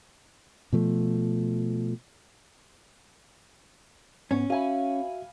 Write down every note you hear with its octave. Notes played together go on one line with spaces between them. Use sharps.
B2 F3 A3
G#2 B3 C#4
F#4 E5 F5 G#5 B5